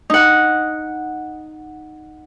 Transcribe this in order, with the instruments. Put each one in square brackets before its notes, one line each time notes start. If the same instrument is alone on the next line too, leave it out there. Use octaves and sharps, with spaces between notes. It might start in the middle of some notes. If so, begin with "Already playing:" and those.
[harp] D#4 F#5